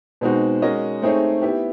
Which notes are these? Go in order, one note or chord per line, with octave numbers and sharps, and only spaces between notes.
B2 G#3 C4 D#4 F#4
G#3 C#4 F#4 A#4 D#5
A3 C4 D#4 G#4 C#5
B3 E4 G4